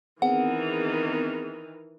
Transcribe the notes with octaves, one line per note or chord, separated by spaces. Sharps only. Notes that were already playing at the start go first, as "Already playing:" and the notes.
D#3 E3 B3 C4 G#4 F#5